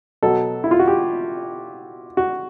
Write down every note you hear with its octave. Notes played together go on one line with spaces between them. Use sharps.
B2 F#3 A4
E4
F4
F#4
G4
F#4